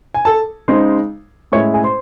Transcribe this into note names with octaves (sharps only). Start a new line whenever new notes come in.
G#5
A4 A5
C#3 G#3 D#4 C5 C6
A2 G#3 C#4 E4 C#5 C#6
G#4 G#5
C5 C6